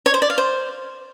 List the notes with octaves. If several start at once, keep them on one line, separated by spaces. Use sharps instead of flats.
C#5
C5
D5
F5
C5